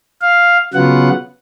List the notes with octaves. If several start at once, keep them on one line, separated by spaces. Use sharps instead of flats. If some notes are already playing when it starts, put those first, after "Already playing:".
F5
C#3 F#3 B3 F4 F#5